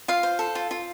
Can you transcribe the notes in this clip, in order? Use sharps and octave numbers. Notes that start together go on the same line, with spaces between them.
F4 F5
C5
A4
F4
F4